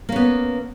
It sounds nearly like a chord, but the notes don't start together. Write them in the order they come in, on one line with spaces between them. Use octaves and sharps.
A#3 C#4 B3